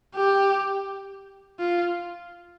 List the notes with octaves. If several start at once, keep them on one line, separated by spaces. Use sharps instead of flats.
G4
F4